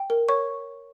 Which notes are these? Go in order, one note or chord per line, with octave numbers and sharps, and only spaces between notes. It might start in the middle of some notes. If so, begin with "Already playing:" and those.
Already playing: G5
A#4
C#5 C#6